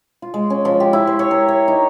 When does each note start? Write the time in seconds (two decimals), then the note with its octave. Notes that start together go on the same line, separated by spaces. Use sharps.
0.22 F4
0.34 G#3
0.50 C#4
0.65 F3
0.80 G4
0.93 E4
1.07 C5
1.19 C#5
1.31 A#4
1.48 C#5
1.68 D#4